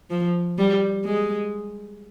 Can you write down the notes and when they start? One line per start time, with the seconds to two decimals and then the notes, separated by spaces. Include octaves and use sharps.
0.10 F3
0.58 G3
1.05 G#3